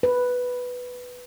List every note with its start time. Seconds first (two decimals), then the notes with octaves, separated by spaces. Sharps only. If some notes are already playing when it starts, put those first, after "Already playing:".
0.03 B4